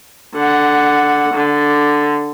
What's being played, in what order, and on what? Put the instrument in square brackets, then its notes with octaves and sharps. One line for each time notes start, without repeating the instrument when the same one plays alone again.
[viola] D3 F#5
D3